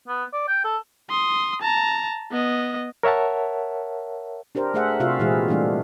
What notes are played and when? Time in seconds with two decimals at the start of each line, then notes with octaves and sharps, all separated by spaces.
0.08 B3
0.33 D5
0.48 G5
0.64 A4
1.10 C6 D#6
1.62 A5 A#5
2.32 B3 D#5
3.03 A#4 C#5 E5 F#5 A5
4.55 D4 G4 A#4 C5
4.74 A3 G#4 C5 E5 F#5
5.00 C3 F4 F#4 E5 F5
5.19 A#2 E3 G#3 C4 E4 G#4
5.48 E3 G3 A3 D4